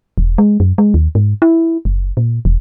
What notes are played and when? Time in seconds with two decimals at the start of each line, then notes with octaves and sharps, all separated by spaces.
0.18 E1
0.38 G#3
0.60 F#2
0.78 G#3
0.94 D#2
1.15 G#2
1.42 E4
1.85 F#1
2.17 A#2
2.45 E1